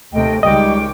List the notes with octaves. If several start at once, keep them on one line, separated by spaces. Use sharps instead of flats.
D#2 C3 A3 D#5 G5
C#2 D#3 G3 G#3 D#5 G5 C#6 D6